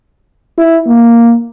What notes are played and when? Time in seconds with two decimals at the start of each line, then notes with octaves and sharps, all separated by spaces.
0.58 E4
0.87 A#3